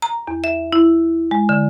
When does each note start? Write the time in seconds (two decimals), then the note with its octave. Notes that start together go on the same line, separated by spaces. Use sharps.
0.02 A#5
0.27 E2
0.44 E5
0.73 E4
1.31 G#3
1.49 D3